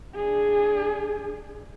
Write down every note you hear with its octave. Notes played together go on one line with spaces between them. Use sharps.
D4 G#4